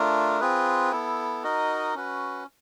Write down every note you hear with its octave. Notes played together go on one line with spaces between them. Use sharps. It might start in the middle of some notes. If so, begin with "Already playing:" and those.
Already playing: A3 D4 F4 A#4
C4 F4 G#4 B4
B3 E4 A4
D#4 F#4 A#4 D#5
C#4 F#4 B4